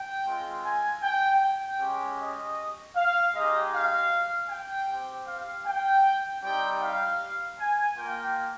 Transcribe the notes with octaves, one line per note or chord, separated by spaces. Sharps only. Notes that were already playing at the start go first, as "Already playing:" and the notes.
Already playing: G5
G#3 C4 F4
G#5
G5
G5
G#3 C#4 G4
D#5
F5
G#3 D#4 G4 D#5
F5
G5
C4 G4
F5
G5
G3 C4 D#4 G4 G5
F5
G#5
A#3 F4 G5